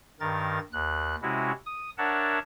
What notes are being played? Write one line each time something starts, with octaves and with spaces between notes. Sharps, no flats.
G2 D#3 A#4 A6
D#2 F#6
C3 G#3 C#4 E4 F#4
D#6
D4 A#4 C#5 E5 F#5 A5